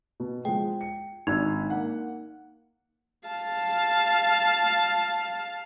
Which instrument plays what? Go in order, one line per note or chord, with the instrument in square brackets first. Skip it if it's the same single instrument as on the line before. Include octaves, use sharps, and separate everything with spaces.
[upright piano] B2
[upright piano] F3 G#3 [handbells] G5
[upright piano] C#7
[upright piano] G#1 D4 E6 [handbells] D#4
[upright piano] A#3 F#5
[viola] F5 A5